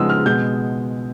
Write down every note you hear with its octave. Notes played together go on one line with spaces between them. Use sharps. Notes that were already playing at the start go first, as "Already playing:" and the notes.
Already playing: C#3 F3 G#3 B3 D#4 D#6 E6
F6
B2 G#3 B3 G6